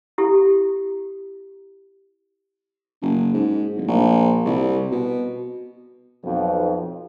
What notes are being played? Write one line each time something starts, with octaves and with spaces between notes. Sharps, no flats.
E4 G4 A4
F#1
G#2
D1
A#1
C2
B2
B1 F2